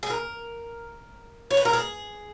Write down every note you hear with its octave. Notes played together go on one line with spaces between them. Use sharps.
G#4
A#4
C#5
B4
A#4
G#4